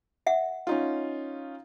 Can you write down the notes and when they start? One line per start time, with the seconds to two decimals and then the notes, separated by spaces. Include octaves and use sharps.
0.27 E5 F#5
0.67 C#4 D#4 F4